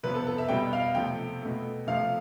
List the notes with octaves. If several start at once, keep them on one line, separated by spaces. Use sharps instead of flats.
C3 F3 B3 B4
A4
A4
E5
B2 G3 B3 G5
F5
C3 F3 A3 G5
B2 A3
C3 F3 A3 F5